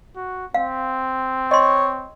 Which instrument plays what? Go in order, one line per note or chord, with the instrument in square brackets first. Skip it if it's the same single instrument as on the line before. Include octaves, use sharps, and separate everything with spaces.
[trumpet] F#4
[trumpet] C4 [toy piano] F5
[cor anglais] C#5 [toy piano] D#5 C6